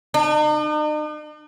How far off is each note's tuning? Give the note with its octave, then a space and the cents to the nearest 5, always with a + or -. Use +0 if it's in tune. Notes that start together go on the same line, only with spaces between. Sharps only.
D#4 -45